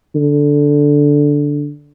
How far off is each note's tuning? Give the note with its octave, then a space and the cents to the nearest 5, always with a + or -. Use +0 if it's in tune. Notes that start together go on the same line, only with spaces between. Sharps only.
D3 -5